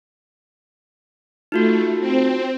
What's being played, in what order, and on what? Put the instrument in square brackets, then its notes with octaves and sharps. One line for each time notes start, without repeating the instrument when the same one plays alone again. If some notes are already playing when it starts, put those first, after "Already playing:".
[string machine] A3 [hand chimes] D#4 F4 F#4
[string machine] C4